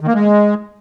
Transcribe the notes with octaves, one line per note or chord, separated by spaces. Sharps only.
D#3
A#3
G#3